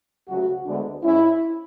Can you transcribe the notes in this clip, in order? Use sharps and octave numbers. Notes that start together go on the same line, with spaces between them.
D2 C#3 F#3 A3 F#4
D2 D3 G#3 B3 D4
G#2 G#3 C#4 E4